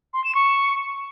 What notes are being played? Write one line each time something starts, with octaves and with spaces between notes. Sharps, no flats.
C6
E7
C#6